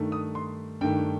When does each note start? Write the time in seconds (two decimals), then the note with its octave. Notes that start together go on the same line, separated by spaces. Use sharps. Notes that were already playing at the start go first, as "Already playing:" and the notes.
Already playing: G2 D#3 A3
0.12 D#6
0.35 C6
0.81 G2 D#3 A3 G5